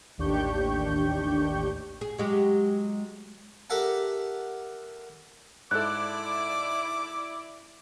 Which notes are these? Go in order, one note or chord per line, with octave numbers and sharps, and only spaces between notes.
A1 D#2 D4 G4 C#6 G6
G#4
F#3 G#3 G4
G4 A4 A#4 E5 F#5 A5
G#2 E4 A4 D5 D6 F#6